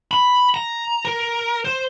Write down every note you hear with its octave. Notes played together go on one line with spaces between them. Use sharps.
B5
A#5
A#4
C5